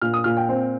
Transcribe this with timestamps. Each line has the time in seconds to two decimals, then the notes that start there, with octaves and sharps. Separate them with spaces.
0.01 A#2 F6
0.14 D#6
0.24 A#2 F6
0.37 G5
0.49 C4